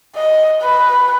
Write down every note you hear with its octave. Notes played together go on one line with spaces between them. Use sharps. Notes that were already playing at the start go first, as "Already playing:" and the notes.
D#5
B4